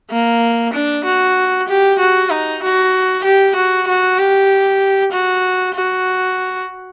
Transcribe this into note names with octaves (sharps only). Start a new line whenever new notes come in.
A#3
D4
F#4
G4
F#4
D#4
F#4
G4
F#4
F#4
G4
F#4
F#4